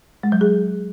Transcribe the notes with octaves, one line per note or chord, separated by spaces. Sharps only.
G#3
F#3
G#4